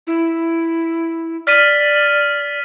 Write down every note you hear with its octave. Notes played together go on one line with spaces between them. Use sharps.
E4
D5 F6 B6 D#7